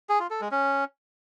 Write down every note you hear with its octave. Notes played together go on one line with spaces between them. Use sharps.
G#4
F4
A4
G#3
C#4